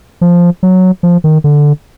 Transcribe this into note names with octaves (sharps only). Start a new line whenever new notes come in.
F3
F#3
F3
D#3
D3